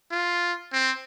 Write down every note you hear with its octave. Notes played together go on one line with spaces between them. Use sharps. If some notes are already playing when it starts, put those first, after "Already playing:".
F4
C4